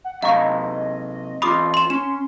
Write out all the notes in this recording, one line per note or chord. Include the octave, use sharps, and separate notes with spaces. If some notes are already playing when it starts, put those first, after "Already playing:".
F#5
C3 F#3 D#5 F5 A#5 C#6
E2 F4 B5 D6 D#6
C6 E7
C#4 C6 E7